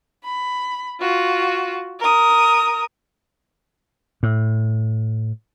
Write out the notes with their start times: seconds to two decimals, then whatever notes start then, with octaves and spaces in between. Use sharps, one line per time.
0.24 B5
1.00 F4 F#4
2.00 A#4 D#6
4.23 A2